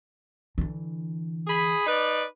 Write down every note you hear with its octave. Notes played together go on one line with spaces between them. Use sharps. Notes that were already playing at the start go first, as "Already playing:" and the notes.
D3 E3
G#4 B5
D#4 B4 D5